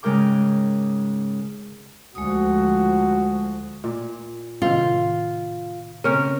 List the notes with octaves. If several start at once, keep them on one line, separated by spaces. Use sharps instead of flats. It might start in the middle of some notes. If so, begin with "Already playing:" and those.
G#2 C#3 G#3 A#4 G5 D6
D2 F3 G#3 F#4 D#6
A#2
A2 C3 D#3 F4
C#3 C4 C#4 A#4 C#5